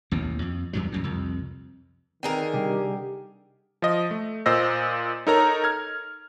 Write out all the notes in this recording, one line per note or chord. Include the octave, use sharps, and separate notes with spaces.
A1 D#2 B2
F2
E2 G2 F#3
A#1 F#2 A2
C2 F2
D3 D#3 C4 G#4 A#4 B4 G5
C3 G3 D4 G4
F3 D#5
A3
A#2 C5 D#5 E6 A#6
D#4 A4 A#4 C#5 A#5
F6 G#6